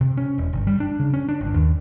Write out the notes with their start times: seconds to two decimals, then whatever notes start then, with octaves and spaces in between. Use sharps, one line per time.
0.01 C3
0.17 C#4
0.38 E1
0.53 G1
0.67 G3
0.80 D4
1.00 C#3
1.14 C#4
1.29 D4
1.41 G1
1.54 D#2